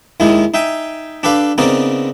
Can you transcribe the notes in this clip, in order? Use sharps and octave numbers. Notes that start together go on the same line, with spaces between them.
D#2 D#3 G#3 D#4 E4
D#4 E5 G5 G#5
D4 G4 A4 B4 F5
C#3 B3 C4 D#4 A#4 D5